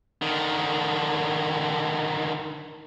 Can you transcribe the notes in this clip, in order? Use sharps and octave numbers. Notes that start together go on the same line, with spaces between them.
D3 D#3